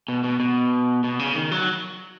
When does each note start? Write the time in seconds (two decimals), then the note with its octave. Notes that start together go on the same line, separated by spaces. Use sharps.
0.08 B2
0.24 B2
0.40 B2
1.04 B2
1.19 C#3
1.35 D#3
1.51 F#3